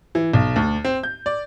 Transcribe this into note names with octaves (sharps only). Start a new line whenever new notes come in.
E3
B1
D2
C4
G6
D5